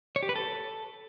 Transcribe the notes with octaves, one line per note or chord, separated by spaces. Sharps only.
C#5
G4
B4
A4